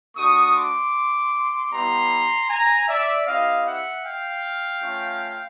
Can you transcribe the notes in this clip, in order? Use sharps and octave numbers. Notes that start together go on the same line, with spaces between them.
A3 D4 F#4 C#6 D#6
C6 D6
G3 B3 E4 G4 A#5 C6
G#5 A#5
D5 E5
C4 E4 G4 D#5 F5
E5 F#5
F5 G5
A3 C#4 F4